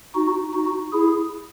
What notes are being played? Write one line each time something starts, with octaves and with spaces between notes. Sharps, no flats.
D#4 F#4
D#4 F#4
E4 G#4